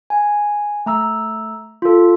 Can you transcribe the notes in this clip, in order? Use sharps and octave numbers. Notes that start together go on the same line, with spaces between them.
G#5
A3 A#5 E6
F4 A4